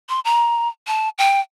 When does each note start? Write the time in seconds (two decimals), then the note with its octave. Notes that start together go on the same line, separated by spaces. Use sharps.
0.09 C6
0.25 A#5
0.87 A5
1.18 G5